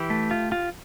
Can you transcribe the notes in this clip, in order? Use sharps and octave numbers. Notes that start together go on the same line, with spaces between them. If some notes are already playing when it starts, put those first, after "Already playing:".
Already playing: E3 G4 G5
A3
F4
F4